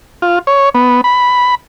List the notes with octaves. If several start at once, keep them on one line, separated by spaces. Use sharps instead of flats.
F4
C#5
B3
B5